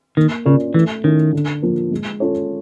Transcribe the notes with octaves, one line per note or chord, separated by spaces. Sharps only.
D#3 A#3
C#3 C#4 F4 A#4 D5
E3 A3
D#3 C#4 E4
D3
F3 A#3
G#3
C#4 F4 A4 C#5